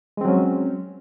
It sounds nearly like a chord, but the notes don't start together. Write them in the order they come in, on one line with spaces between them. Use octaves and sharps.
G#3 C4 F#3 C#4